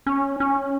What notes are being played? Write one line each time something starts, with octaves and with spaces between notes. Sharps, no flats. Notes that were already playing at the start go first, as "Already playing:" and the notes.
C#4
C#4